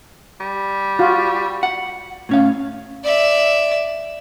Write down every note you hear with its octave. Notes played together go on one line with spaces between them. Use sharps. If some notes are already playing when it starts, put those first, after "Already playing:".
G3
F4 F#4
F#5
A2 C#4 F5
D5 E5